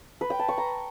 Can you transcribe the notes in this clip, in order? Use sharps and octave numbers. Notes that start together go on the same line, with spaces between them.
B4
G5
A5
C#6
A#5